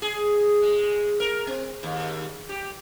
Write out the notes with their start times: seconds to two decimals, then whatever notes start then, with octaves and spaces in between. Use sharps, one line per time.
0.02 G#4
0.62 G#3
1.20 A#4
1.47 C4
1.83 D#2
2.49 G4